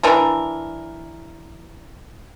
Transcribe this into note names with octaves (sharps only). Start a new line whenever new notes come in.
E3 D4 A#4